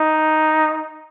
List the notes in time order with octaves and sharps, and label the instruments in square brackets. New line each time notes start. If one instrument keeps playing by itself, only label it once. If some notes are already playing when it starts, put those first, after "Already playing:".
Already playing: [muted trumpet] D#4